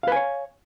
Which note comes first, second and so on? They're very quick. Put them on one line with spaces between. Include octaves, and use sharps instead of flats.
F5 B4 G#5 C#5